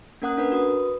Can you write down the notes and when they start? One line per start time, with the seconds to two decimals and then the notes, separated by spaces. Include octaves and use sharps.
0.22 A#3 C#4 A#4 F#5 D#6 F#6
0.37 D4 A#4 B4
0.52 F#4 B4 D#6